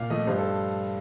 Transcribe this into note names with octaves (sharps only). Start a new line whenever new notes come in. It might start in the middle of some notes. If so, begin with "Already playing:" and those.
Already playing: A#2 F5
F3 A3 D#5
G2 C5
A4